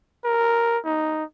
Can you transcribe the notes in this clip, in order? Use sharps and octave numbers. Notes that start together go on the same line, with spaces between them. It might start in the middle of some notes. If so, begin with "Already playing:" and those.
A#4
D#4